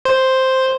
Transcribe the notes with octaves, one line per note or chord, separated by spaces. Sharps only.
C5